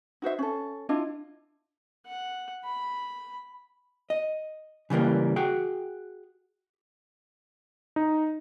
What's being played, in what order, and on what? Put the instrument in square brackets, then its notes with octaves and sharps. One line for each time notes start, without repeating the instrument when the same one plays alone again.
[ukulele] D#4 F#4 C5 E5
C#4 A4
D4 E4 F4 D#5
[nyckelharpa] F#5
B5
[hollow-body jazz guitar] D#5
C#3 E3 G3 A#3
F#4 G#4 G5
[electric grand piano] D#4